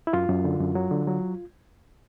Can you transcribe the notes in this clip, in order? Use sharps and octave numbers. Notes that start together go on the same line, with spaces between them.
E4
F#2 F4
F#2
D3
F#2
F#3
D3
F#3